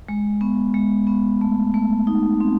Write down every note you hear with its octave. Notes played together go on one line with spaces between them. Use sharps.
G#3
B3
G#3
B3
A3
A3
D#4
C4